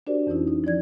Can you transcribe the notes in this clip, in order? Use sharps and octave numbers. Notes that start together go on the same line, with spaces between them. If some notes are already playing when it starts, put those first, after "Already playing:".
D4 F#4 G4 A#4 C5 D5
F2 E3 C#4 D#4 E4
D#4
F3 E4 D5 G#6